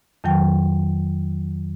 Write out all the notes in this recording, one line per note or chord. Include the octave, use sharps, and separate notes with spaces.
F2 D#3 F#3 G5